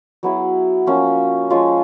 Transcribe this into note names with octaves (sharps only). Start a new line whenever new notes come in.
F#3 B3 E4 G#4
F3 A#3 C#4 F#4
F3 G#3 C#4 F4